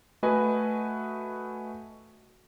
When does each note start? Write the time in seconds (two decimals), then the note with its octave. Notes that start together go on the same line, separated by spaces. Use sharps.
0.23 A3 F#4 B4 D#5 G#5